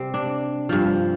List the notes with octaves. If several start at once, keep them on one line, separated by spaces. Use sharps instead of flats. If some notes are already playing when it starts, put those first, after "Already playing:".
Already playing: C3 G3 C4
D4
G2 F3